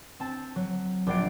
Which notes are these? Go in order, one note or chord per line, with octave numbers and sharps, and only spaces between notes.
C4 A5
F#3
A#1 G4 D5 F#5 C7 D7